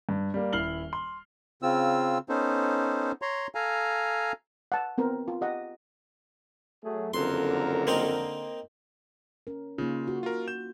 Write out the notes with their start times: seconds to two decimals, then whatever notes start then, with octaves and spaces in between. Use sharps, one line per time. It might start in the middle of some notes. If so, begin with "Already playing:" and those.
0.09 G2
0.34 G3 A#3
0.53 D#1 E4 F6 C7 F#7 G7
0.93 C6
1.62 C#3 C4 F4 E6
2.29 B3 C#4 D#4 A4 C5
3.22 C#5 A#5 C6
3.55 A4 F5 G#5 A#5
4.72 F#5 A5
4.98 B3 C4 A#4 C5
5.28 F4
5.41 G4 D#5 F#5
6.84 F#3 A3 G#4
7.14 F#1 F2 D3 A#4 C6
7.87 A#3 C4 D#4
9.47 C#4 A#4
9.78 C#3 A#3 D#4 F4
10.08 F#4
10.23 F4 A#4
10.48 G6 E7